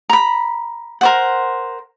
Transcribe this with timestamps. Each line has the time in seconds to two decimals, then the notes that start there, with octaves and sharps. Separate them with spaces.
0.10 A#5 B5
1.01 A#4 C5 F#5